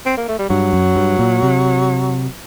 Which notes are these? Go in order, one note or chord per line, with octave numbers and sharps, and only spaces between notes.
C4
A#3
A3
G3
G2 F#3
F#2
G2
A#2
C3